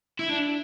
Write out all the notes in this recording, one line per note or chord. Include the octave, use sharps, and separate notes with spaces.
E4
D4